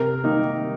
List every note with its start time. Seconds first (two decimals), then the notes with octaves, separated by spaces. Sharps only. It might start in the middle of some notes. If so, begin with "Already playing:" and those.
Already playing: C3 A#4
0.24 D#3 A#3 D#4